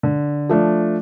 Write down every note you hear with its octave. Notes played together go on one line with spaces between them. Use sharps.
D3
F3 A3 D4